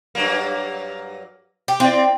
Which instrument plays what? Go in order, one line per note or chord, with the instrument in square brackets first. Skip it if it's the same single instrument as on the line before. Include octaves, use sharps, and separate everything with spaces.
[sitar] G2 F#3 A#3
[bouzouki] G4
[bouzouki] C4 [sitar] E4 D5